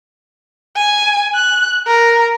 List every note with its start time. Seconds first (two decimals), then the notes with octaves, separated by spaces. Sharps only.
0.77 G#5
1.35 F#6
1.87 A#4